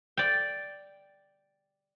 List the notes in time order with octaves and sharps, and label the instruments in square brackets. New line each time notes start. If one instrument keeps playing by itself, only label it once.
[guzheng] D5 G5